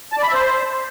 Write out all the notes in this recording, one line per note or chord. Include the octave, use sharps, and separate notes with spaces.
A5
D5
B5
E5
C5